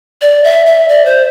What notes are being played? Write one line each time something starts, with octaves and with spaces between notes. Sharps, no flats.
D5
E5
E5
D5
C5